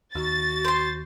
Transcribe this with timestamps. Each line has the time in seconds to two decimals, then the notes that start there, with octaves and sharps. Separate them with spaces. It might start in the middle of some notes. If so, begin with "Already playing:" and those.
0.15 D#2 F#4 A6
0.65 C5 C6